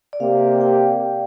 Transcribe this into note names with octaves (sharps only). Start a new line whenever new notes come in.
D5
C3 A#3 G4 F5
G5